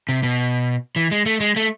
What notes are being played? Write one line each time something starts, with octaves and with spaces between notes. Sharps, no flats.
C3
B2
E3
G#3
A3
G#3
A3